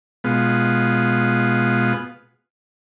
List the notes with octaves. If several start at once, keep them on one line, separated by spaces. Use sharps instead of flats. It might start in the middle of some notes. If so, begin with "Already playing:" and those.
B2 G#3 B3 F4